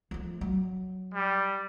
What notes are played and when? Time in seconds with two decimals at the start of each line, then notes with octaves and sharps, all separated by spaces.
0.11 F3 A3
0.41 F#3
1.14 G3